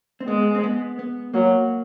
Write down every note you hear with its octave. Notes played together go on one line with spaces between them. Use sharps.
C4
G#3 B3
C4
B3
B3
F#3 A#3